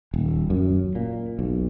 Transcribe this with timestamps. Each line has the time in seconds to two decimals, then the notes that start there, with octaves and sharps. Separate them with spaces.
0.14 D#1
0.50 F#2
0.95 A#2
1.39 B1